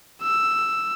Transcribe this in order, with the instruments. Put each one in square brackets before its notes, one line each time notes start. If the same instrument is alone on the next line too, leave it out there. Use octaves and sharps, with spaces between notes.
[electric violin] E6